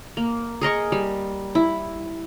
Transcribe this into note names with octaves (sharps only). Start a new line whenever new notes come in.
A#3
G#4 A#4 D#5 C#6
G3
E4